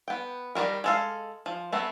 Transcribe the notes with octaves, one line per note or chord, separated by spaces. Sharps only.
B3 G5
D#3 G3 A#3 A#4
G#3 A4 F5
F3
A3 B3 C4